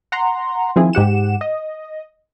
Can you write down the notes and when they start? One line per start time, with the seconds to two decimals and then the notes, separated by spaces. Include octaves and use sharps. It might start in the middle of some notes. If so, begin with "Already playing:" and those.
0.12 F#5 A#5 C6
0.76 D#3 F3 C4 E4 G#4
0.93 G#2 G4 F#5 E7
1.41 D#5